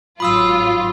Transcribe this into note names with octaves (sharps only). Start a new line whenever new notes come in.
G#1 F#3 F4 B5 D#6 E6